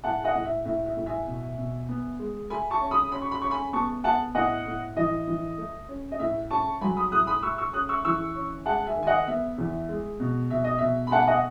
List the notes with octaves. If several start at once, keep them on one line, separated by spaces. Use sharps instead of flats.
A2 F#5 A5
D#5 F#5
A2
E5
A2 E5
E5
A2
E5 G#5
B2
B2
B3
G#3
A3 G#5 B5
A5 C#6
C#4
B5 D#6
C#4 B5
C#6
B5
C#4 C#6
G#5 B5
B3 A5 C#6
B3 F#5 A5
A2 D#5 F#5
A2
E3 D#5
E3
A3
C#4
D#5
A2 E5
C#4 A5 C#6
F#3 G#5 B5
B5 D#6
A2 D#6 F#6
B5 D#6
A3 C#6 E6
C#6 E6
C#4 D#6 F#6
C#6 E6
E3 C#6 E6
C#4
G#3 F#5 A5
E5 G#5
D#3
G#5
D#5 F#5
B3 E5
E2
G#3
B2
B2 E5
D#5
B2 E5
B5
A3 F#5 A5
D#5 F#5